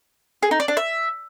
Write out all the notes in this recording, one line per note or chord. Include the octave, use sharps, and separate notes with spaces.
G#4
D#4
D5
D4
E5